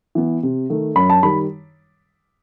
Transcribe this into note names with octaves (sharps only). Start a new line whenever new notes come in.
E3 B3
C3
D#3 A3
F#2 B5
A5
D#3 G3 B5